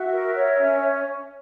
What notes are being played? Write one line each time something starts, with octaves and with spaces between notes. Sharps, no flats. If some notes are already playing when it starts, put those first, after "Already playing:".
Already playing: F#4 E5
A#4
C#5
C#4